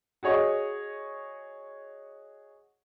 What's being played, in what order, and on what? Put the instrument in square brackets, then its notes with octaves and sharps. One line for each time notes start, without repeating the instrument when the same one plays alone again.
[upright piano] F#4 G#4 C#5 D#5